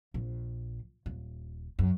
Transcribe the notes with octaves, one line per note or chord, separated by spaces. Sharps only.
A#1
D#1
F#2